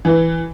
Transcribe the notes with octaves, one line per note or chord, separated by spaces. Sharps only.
E3